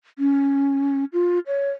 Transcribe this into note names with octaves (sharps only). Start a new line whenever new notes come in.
C#4
F4
C#5